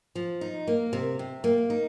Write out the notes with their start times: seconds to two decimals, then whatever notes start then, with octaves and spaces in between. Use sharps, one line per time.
0.15 F3
0.41 D#4
0.68 A#3
0.93 C3
1.19 C3
1.44 A#3
1.70 D#4